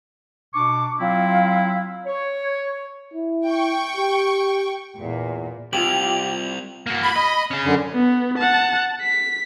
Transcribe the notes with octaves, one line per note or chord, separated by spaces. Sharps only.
B2 D4 C#6 D6
F#3 C4 E4 F4
C#5
E4
G5 C#6
G4
E2 A#2
C2 F4 G4 G5 F7 F#7
A#3 F#4
B5
D#5
C#4 G#4
F#2 D3
B3
F#5 A5
B6